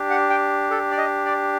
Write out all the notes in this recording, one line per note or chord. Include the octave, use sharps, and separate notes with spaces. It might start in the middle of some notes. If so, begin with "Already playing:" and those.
Already playing: D4 G4
F#5
G5
A4
D5
D#5
D5